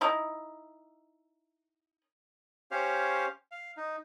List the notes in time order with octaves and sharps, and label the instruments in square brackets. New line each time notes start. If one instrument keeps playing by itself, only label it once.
[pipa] D#4 E4
[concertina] C#4 G4 C5 C#5 F5
F5
D#4